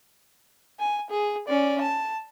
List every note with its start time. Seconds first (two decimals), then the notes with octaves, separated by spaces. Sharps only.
0.79 G#5
1.10 G#4
1.48 C#4 D5
1.81 A5